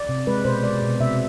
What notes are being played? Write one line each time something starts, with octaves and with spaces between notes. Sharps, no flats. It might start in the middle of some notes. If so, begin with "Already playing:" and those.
Already playing: D5
C3
G#3 B4
B2 C5
G#3 D5
B2
C3 E5